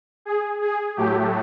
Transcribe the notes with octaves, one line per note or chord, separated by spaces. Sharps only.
G#4
G#4
A2 F#3 A3 G4